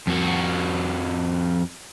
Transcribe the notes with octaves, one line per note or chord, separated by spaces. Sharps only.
F2 F#4